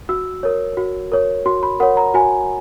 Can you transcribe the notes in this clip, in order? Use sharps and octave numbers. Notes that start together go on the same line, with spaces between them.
F#4 E6
A#4 C#5
F#4
A#4 C#5
F#4 C6
B5
A#4 C#5 F#5
A#5
F#4 G#5